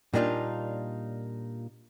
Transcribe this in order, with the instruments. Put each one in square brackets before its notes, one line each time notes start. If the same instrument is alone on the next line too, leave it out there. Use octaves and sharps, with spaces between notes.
[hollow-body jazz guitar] A#2 G3 A#3 D4 D#4 F4